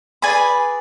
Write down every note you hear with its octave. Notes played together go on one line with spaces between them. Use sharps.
G#4 B4 D5 G#5 B5